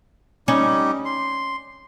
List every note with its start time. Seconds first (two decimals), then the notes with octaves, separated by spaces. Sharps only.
0.48 G3 C#4 D#4 G4
1.05 C6